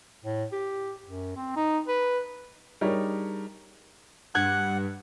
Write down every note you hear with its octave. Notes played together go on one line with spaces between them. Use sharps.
A2
G4
F#2
C4
D#4
B4
G3 D4 D#4 G#4 A#4 C#5
G2 F#5 F#6 G#6